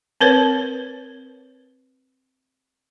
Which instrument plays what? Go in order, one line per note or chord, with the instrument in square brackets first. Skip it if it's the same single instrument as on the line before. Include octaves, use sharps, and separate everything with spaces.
[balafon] C4 A#4 B4 C#5